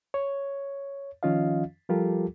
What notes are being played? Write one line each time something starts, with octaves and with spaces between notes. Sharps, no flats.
C#5
D#3 F3 C#4 F4 D#5 F5
F3 G3 F4 G4 A4 A#4